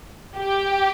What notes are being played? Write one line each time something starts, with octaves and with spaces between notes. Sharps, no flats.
G4